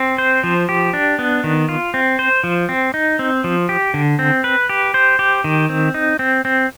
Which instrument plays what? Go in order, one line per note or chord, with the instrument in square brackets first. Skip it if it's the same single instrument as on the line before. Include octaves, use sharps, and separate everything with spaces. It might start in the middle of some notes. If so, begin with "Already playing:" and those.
Already playing: [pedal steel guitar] C4
C5
F3
G4
D4
B3
D#3
F4
C4
C5
F3
C4
D#4
C4
F3
G4
D3
C4
B4
G4
C5
G4
D#3
C4
D#4
C4
C4